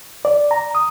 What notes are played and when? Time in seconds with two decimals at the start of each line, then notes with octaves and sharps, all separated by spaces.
0.25 D5
0.51 A#5
0.75 D#6